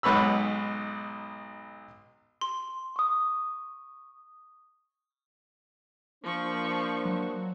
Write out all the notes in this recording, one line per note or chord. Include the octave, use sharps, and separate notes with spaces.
B1 G#2 B4 C#5 B5 E6
C6
C#6 D#6
F3 A#3 D4 C5 C#6
F#3